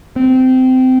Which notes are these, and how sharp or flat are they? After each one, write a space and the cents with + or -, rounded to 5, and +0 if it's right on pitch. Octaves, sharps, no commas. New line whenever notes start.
C4 -20